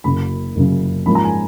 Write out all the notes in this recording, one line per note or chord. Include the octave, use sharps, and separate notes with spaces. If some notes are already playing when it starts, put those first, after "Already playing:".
F#1 F#2 C#3 B5
F#1 F#2 C#3
G#2 F3 A#3 C#4 B5
A#5
G#5